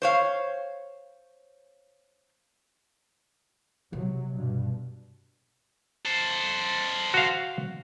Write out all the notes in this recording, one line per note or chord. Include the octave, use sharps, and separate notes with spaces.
C5 C#5 F5
C3 F#3 G#3
G2 B2
A4 C5
F#4 F5